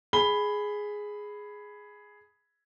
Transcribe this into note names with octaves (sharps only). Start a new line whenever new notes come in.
G#4 B5 G7